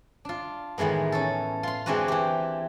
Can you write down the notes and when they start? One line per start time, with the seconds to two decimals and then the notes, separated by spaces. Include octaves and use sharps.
0.25 D4 F4
0.78 A2 D#3 E3 G#3 B3
1.12 C#4 A4
1.63 F4 C6
1.86 E3 G#3 C4 D4 F#4 B4
2.08 E3 G4